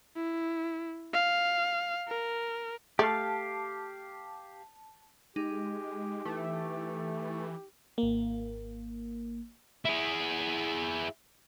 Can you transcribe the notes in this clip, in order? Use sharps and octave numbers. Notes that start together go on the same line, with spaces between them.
E4
F5
A#4
A3 G4 F5 A5
G#3 D#4 G4
E3 A3
G#1 A#3
E4 G#4